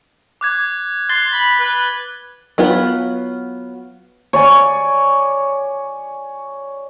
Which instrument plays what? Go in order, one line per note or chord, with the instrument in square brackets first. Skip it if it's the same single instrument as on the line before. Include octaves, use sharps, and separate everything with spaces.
[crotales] D6 F#6 G#6
[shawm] C6 [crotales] F#6 A6 G7
[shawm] B5
B4
[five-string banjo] F#3 B3 F4 B4
[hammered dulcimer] C#5 D5 G#5